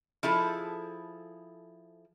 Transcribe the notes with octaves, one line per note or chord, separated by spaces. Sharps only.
F3 E4 G#4 A4